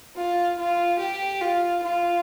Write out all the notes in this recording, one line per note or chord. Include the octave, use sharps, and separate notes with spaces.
F4
F4
G4
F4
F4